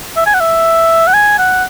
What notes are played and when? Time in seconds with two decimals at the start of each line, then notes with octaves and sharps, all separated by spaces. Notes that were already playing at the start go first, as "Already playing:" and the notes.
0.17 E5
0.26 G#5
0.34 F#5
0.41 E5
1.08 F#5
1.14 G#5
1.38 F#5